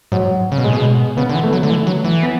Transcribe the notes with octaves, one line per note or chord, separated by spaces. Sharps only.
G#2 F#3
C#3
B2
A2 G#3
B2
C#3 B3
D3
E3
A3
F#3
D3
E3 A3
F#3
E3
B3